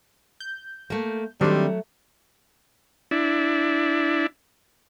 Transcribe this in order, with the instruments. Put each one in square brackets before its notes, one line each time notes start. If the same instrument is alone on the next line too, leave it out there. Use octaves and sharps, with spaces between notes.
[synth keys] G6
[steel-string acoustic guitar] A3 A#3
[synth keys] D#3 C4 D4 [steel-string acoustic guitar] F#3 A3 [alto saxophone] G3
[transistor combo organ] D4 E4